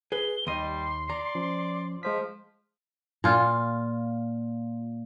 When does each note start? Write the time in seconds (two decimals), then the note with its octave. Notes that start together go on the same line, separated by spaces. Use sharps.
0.12 G#4 B4 G7
0.47 D#2 G3 D#5 C6
1.10 D5 A#5
1.35 F3 C#4
2.03 F3 G#3 C5 B6
3.24 A#2 F4